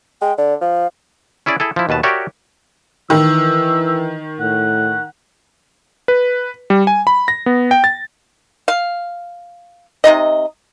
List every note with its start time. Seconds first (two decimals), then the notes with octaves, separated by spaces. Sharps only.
0.21 G#3 G5
0.38 D3 D5
0.61 F3 F5
1.46 C#4 E4 G#4 D5
1.60 E4 G#4 A4
1.76 F3 E4
1.89 D#2 B2 B4 A5
2.03 F#4 G4 A#4 C#5 D5 E5
3.10 D#3 E3 E6
4.40 A2 F#5
6.08 B4
6.70 G3
6.87 G#5
7.07 B5
7.28 A#6
7.46 B3
7.71 G5
7.84 A6
8.68 F5
10.04 C3 A3 D#4 D#5